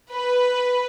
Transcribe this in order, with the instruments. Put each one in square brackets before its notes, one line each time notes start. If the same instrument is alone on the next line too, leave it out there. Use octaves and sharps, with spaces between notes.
[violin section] B4